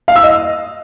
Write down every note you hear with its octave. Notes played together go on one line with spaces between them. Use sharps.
F5
E6
D#5